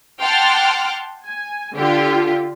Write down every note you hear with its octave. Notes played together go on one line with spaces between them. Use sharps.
F#5 G5 A5 C6 D6 F6
G#5
D3 F4 G4